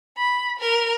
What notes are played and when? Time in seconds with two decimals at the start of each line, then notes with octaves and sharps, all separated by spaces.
0.17 B5
0.59 A#4